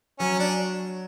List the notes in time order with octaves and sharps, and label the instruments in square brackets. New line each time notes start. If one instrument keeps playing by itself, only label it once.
[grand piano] F#3 [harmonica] C#4
[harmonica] D4